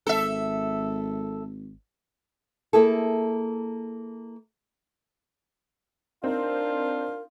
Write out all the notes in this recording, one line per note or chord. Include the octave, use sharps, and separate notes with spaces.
G#1 A4 E5
A#3 E4 G#4 A4
C4 D4 D#4 F4 A#4